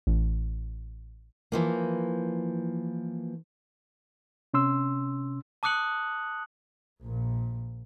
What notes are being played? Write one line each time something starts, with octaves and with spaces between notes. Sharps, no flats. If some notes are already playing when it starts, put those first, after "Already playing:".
A1
E3 F3 A#3
C3 C#4 C6 E6
A5 D6 D#6 F#6 C#7 F#7
A#1 A#2